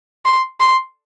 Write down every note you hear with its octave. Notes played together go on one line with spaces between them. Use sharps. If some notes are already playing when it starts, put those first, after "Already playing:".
C6
C6